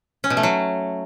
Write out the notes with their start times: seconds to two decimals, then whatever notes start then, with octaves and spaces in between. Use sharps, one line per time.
0.24 C#4
0.30 B2
0.37 A3
0.43 F#3